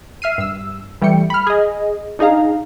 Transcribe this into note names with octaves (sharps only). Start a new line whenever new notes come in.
E5 F6 C7 D#7
G2 E6
E3 G3 A3 G5 C#7
B5 F6
G#4 D#5
D4 D#4 G#4 F5 A#5